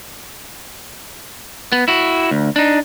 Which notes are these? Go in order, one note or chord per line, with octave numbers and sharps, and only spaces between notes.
B3
E4 F#4
D2
D4 D#4